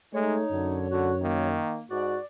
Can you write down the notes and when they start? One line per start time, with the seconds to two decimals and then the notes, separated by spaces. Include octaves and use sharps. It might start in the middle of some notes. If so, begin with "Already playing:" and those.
0.14 G#3 A3 D#4 C#5
0.52 F#2 D3
0.91 D3 F#4
1.22 D#3 A#3
1.90 G#2 F#4 D5